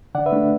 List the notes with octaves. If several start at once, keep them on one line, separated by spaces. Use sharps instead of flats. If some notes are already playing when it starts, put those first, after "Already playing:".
D3 D5 F#5
B4 E5
A3 D4